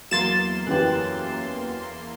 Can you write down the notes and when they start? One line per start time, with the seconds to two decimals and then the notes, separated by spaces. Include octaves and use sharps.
0.11 E2 F#3 A#3 C6 A6 E7
0.67 F#2 E3 G4 F#6